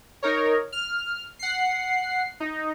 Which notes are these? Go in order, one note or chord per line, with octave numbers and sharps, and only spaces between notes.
D#4 A#4 C#5
F6
F#5 C7
D#4